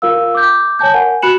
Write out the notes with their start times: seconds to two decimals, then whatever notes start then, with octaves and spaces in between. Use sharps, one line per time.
0.02 F4 A#4 F5 E6
0.35 D6 G6
0.79 C#5 G#5 A5 G6
0.94 A#4 F#5 G#5
1.22 F#4 B5 F#6 C#7 E7 F#7